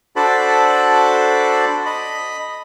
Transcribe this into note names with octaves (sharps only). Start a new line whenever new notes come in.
D4 F#4 A4 C5 D5 B5
D#5 B5